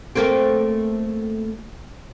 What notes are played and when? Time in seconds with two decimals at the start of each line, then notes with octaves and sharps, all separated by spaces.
0.16 A3 A#3 C4